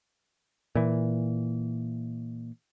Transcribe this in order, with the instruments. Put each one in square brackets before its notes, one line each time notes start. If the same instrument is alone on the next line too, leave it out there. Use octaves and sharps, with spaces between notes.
[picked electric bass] A#2 E3